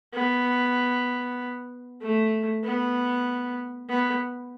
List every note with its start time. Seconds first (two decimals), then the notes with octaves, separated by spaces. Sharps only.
0.14 B3
2.01 A3
2.63 B3
3.89 B3